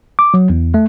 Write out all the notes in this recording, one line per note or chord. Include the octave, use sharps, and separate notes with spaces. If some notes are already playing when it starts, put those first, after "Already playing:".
D6
F#3
E2
A3